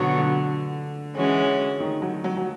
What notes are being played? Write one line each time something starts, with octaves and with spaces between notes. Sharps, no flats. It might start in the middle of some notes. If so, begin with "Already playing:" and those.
Already playing: B2 D3 F#3 B3
D3
E3 G#3 C#4 F#4
D#3
F#3
F#3
F#3